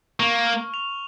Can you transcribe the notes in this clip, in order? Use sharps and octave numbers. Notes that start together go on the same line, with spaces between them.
A#3 C#6
F6
F7